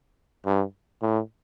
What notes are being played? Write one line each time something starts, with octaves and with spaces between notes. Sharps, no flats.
G2
A2